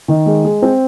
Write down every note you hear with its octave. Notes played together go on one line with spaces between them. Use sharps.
D#3
G#3
G#3
C4